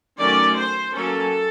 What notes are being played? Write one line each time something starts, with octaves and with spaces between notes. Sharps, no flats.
D#3 F#3 A3 C#4 D5
C5
F#3 A#3 C#4 A4